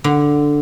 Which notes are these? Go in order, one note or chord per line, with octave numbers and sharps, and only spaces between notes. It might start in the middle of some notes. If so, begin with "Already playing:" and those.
D3